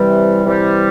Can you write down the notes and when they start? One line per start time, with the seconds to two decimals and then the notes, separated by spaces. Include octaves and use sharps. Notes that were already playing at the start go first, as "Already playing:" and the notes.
Already playing: C3 E3 G3
0.44 C3 E3 G3